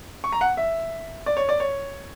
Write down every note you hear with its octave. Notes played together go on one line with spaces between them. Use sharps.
C#6
A#5
F#5
E5
D5
C#5
D5
C#5